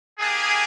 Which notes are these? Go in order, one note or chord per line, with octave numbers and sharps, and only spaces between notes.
A#3 D4 G4 G#4